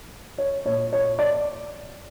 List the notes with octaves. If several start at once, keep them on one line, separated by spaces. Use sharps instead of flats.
C#5
A#2 C#5
C#5
D5